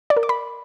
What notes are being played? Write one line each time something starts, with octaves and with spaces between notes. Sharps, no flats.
D5
A#4
D6
B5